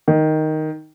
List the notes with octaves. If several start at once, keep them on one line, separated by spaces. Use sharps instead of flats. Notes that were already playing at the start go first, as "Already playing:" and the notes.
D#3